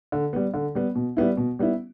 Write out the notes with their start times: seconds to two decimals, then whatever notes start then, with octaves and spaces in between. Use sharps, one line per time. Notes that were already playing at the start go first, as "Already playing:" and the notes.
0.12 D3
0.33 G3 B3
0.54 D3
0.75 G3 B3
0.95 B2
1.17 G3 B3 E4
1.37 B2
1.59 G3 B3 E4